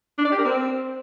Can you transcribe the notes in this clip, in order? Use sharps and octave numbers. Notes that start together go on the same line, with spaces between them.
D4
D5
G4
A#4
C4